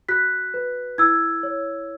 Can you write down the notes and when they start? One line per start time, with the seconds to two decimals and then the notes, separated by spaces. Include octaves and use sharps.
0.09 F#4 F#6 B6
0.54 B4
0.98 E4 E6 G#6
1.43 C#5